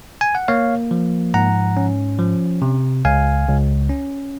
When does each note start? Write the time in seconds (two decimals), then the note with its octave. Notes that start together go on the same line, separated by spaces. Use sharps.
0.21 G#5
0.35 F#5
0.48 A#3 C#5 F5
0.91 F3
1.34 G#2 F#5 A#5
1.77 C#4
2.19 F3
2.62 C3
3.05 C#2 F5 G#5
3.48 C#2
3.90 C#4